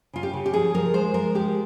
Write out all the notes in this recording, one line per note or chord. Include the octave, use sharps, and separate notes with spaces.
C#3 F4
G4
C#3
G4
F3 G#4
F3 A#4
G#3 C5
F3 A#4
G#3 G4